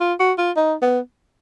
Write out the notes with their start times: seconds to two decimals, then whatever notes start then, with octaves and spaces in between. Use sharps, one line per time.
0.01 F4
0.20 F#4
0.38 F4
0.57 D#4
0.82 B3